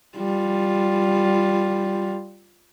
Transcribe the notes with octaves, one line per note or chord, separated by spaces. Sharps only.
G3 F4